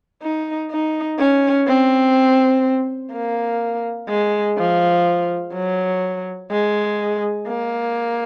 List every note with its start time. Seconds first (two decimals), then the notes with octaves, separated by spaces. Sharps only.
0.22 D#4
0.71 D#4
1.19 C#4
1.67 C4
3.12 A#3
4.09 G#3
4.58 F3
5.54 F#3
6.51 G#3
7.48 A#3